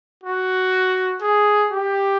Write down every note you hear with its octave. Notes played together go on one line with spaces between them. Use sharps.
F#4
G#4
G4